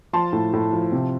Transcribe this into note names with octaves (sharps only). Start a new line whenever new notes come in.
F3 A5 C6
A2
A2
F3
C3